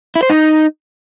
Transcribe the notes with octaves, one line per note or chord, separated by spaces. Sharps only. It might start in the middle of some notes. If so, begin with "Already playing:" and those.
E4
C5
D#4